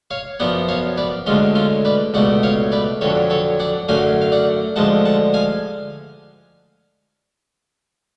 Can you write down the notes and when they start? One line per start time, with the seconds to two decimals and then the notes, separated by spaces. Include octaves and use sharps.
0.11 C#5 F5
0.40 F#2 F3 B3 D5 F#5
0.68 C#5 F5
0.98 B4 D5
1.26 D2 D3 G#3 C#4 F4
1.55 C#4 F4
1.85 B4 D5
2.14 C#2 B2 A3 D5 F#5
2.43 C#5 F5
2.72 B4 D5
3.01 F2 D3 F#3 A4 C#5
3.30 A4 C#5
3.59 D5 F#5
3.88 F#2 D3 F#3 A3 F5 G#5
4.22 F5
4.32 D5 F#5
4.76 D2 D3 F3 G#3 F#5 A5
5.05 F#5 A5
5.34 F5 G#5